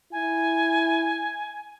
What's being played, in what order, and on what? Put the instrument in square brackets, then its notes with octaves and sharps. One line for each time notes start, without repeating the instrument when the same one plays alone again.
[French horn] E4 [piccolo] G#5